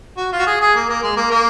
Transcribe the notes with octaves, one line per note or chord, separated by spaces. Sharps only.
F#4
F4
F#4
G#4
G#4
A#3
A#3
G#3
A#3
A#3